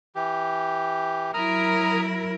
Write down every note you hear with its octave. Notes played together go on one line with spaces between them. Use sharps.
E3 G4
F#3 E4 A#4 A#5 D#6 F6